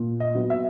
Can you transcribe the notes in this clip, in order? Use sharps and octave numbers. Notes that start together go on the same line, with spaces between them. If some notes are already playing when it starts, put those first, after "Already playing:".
Already playing: A#2
D#5
F#3 B3
E5